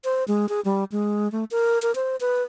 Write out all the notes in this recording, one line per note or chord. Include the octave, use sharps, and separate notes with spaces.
C5
G#3
G#4
G3
G#3
A3
A#4
A#4
C5
B4